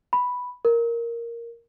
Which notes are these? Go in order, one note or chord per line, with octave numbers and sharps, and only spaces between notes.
B5
A#4